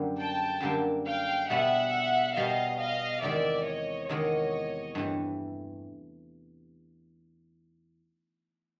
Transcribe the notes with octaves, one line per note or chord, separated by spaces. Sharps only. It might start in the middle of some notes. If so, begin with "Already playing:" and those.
Already playing: F#2 D3 G3 A#3
G5 A5
F#2 D3 G3 A#3
F5 G5
B2 G3 B3 E5 F#5
B2 G3 B3 D#5 F5
D#5 F5
E2 C3 D#3 G#3 D5 E5
C#5 D#5
E2 C3 D#3 G#3 C#5 D#5
G2 E3 A3